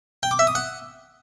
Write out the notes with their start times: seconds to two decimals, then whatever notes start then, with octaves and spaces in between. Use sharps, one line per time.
0.23 G5
0.31 D6
0.39 E5
0.47 D#6
0.55 F#5